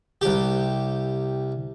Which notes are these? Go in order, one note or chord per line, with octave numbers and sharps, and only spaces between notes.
C2 G4